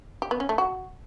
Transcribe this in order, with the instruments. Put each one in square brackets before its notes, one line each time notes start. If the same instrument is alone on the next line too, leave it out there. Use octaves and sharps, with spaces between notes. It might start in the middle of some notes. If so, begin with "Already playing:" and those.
[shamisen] G4
B3
C#4
A3
F#4